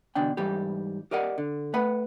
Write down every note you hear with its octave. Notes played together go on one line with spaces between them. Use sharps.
E2 B2 D3 D4 G5
G#2 E3 G3 G4
G4 A#4 D5 D#5 F#5
D3
A3 B4 F#5 B5